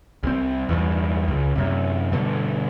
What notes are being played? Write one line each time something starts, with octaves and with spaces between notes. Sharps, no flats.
C2 C4
E2 G2
C#2
F#2 C3
G2 B2 D3